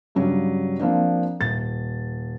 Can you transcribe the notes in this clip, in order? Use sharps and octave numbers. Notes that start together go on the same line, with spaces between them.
G2 C#3 F#3 G3
F3 A#3 C4 D4
D#1 A6